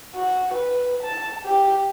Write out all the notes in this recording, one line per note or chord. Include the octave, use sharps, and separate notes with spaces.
F#4
B4
A5
G4